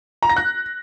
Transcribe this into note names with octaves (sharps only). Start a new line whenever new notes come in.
A#5
A#6
F#6